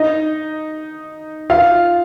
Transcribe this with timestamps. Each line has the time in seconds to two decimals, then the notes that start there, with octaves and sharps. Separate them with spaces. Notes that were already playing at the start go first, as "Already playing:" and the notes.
Already playing: D#4 D#5
1.50 F4 F5